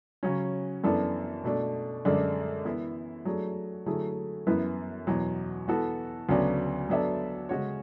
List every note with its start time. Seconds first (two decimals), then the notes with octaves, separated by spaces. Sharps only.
0.23 C#3 F#3 C#4
0.84 F#2 E3 B3 D4 A4
1.44 B2 A3 D4
2.05 F#2 D3 G#3 D4
2.65 E3 B3 E4
3.25 F#3 A3 D4 G#4
3.86 D3 F#3 A3 E4 G#4
4.47 F#2 E3 B3 E4 B4
5.07 E2 B2 F#3
5.68 E3 B3 F#4 A4
6.29 D2 C#3 F#3 B3 D4
6.89 F#3 B3 D4 A4 E5
7.49 C#3 G#3 C#4 F#4 C#5